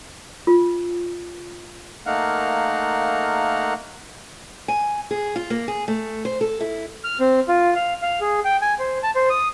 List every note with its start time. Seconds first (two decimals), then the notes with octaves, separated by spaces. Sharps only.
0.47 F4
2.06 A3 A#3 D#4 A#4 F5 F#5
4.68 G#5
5.11 G#4
5.36 F4
5.50 A#3
5.68 G#4
5.88 A3
6.25 C5
6.41 A4
6.61 E4
7.04 F6
7.20 C4
7.48 F4
7.75 F5
8.02 F5
8.21 G#4
8.44 G5
8.62 G#5
8.79 C5
9.03 A5
9.16 C5
9.30 D#6